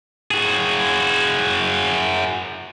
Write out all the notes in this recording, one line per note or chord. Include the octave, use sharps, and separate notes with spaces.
F#4 G#4